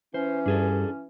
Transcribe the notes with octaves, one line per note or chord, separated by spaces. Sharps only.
E3 C#4 C5
G2 D4 G#4 A4